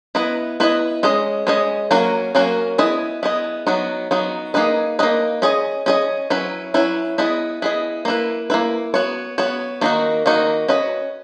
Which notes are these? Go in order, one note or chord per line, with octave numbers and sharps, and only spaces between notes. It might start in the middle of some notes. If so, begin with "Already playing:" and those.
B3 E4 B4 D#5
B3 E4 B4 D#5
G#3 C#4 G#4 D#5
G#3 C#4 G#4 D#5
F#3 A#3 C#4 F#4 A#4
F#3 A#3 C#4 F#4 A#4
B3 E4 G#4 D#5
B3 E4 G#4 D#5
F#3 B3 D#4 F#4
F#3 B3 D#4 F#4
A#3 D#4 G#4 B4 D#5
A#3 D#4 G#4 B4 D#5
C#4 G#4 D#5
C#4 G#4 D#5
F#3 C#4 E4 B4
F#3 C#4 E4 B4
B3 E4 G#4 D#5
B3 E4 G#4 D#5
A#3 E4 B4
A#3 E4 B4
B3 F#4 C#5
B3 F#4 C#5
D#3 A#3 D#4 F#4
D#3 A#3 D#4 F#4
C#4 F#4 B4 D#5